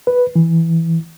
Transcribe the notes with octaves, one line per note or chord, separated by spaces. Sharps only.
B4
E3